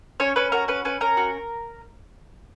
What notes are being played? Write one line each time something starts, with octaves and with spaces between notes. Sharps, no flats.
C#4 C#5
C#4 B4
F#4 A#4
C#4 B4
C#4 B4
C#4 A#4
F#4